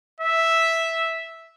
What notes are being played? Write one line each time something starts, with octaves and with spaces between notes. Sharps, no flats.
E5